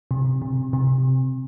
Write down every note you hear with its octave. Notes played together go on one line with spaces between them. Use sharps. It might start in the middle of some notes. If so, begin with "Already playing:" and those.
C3
C3
C3